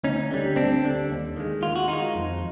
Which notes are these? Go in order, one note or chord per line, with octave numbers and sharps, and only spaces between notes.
D2 C#4 D#4
D3 G3
D2 C4 D4
D3 G3
D#2
D#3 G#3
D#2 F4
F#4
D#3 G#3 D#4 F4
F2